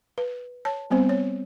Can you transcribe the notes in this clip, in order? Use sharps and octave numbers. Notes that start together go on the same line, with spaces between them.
B4
C#5 A5
G3 B3 C4 C5
C#5